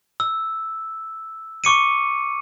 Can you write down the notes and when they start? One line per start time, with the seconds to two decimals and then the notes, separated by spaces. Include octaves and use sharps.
0.20 E6
1.64 C#6 D6 C#7 D#7